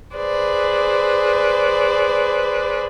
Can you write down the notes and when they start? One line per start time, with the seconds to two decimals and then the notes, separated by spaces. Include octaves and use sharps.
0.16 G#4 B4 C5 D5